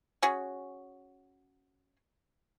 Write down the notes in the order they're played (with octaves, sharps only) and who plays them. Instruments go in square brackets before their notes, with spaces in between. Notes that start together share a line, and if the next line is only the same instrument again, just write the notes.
[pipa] C#4 F#4 G#4